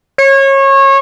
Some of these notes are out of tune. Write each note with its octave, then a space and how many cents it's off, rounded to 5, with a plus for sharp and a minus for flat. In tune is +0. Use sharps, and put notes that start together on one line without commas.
C#5 -25